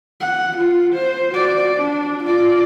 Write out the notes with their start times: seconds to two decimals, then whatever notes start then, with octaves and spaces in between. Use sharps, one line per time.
0.21 F#5
0.57 F4
0.94 C5
1.31 F#4 D5
1.77 D4
2.23 F4 D5